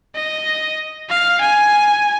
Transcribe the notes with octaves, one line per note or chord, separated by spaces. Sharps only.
D#5
F5
G#5